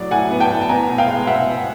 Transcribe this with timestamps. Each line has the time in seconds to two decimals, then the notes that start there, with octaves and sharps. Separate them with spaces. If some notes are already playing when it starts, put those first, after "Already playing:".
Already playing: A2 F#3 D5
0.11 A2 F#5 G#5
0.31 B3
0.40 G5 A5
0.50 A2
0.61 A5
0.69 B3 G#5 A#5
0.89 B2
0.98 F5 G5
1.08 G#3
1.27 B2 E5 F#5
1.46 B3